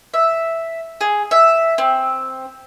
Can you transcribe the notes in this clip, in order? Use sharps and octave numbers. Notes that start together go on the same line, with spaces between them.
E5
G#4
E5
C4